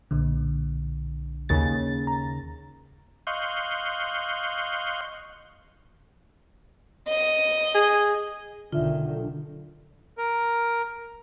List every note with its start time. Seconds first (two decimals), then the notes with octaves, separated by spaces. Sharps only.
0.11 B1 A#2 D3
1.49 D#2 C#3 A6
2.07 A#5
3.27 D#5 F5 C6 C#6 F#6 G6
7.08 D#5
7.75 G#4
8.72 B1 D3 D#3 F4 E5
10.18 A#4